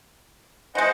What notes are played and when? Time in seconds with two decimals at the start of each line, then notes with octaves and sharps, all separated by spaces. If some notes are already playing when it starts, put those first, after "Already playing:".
0.75 E3 G#3 C5 D#5 F#5